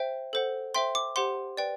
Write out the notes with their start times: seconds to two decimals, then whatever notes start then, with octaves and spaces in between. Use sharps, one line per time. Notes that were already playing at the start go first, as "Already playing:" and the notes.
Already playing: C5 E5 G5
0.33 A4 C5 F#5
0.74 C5 E5 G5 C6
0.95 D6
1.16 G4 C5 F#5 C6
1.57 B4 D5 G5